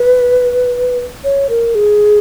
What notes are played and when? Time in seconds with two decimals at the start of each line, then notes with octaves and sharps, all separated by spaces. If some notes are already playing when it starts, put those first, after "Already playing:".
Already playing: B4
1.24 C#5
1.49 A#4
1.75 G#4